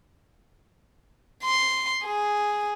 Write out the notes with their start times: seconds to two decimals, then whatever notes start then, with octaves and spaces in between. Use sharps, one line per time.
1.44 C6
2.04 G#4